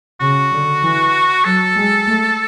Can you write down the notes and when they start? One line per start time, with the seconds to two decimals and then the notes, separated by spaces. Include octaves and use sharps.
0.21 C#3 F#4
0.52 D3
0.83 E3
1.45 F#3 A4
1.76 G#3
2.07 A3